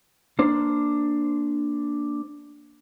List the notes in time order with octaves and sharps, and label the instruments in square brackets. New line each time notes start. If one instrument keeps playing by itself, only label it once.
[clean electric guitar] A#3 D4 C5